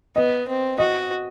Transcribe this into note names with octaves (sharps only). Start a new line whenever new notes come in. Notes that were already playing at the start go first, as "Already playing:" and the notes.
B3 D#5
C4
F#4 D#5